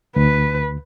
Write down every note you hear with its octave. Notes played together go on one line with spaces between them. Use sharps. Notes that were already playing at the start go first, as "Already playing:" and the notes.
D2 B4